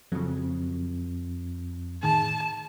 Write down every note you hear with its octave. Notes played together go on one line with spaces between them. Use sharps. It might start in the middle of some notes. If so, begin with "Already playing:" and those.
F2 C#3 F3 F#3
A2 D#3 G#4 A5